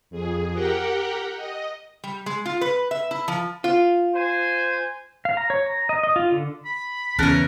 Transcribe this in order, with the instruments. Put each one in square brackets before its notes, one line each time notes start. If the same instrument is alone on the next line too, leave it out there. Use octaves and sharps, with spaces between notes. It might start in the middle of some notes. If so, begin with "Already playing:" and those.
[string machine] F2 G#4
G4 A#4 F#5 G5
D#5
[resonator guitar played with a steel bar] G3
G#3
F4
B4
E5
E4
F3
[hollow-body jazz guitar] F4
[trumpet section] C5 G#5
[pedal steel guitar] F5
A#5
C#5
A#5
D#5
D#5
F4
D3
[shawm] B5
[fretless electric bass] E2 [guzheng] C#3 E3 [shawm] A#4 [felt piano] A5 F#6 A6